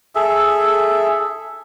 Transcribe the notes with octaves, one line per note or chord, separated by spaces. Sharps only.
G#4 A4 E5